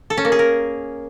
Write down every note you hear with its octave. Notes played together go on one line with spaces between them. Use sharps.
A4
C#4
A#3
G#4
A#4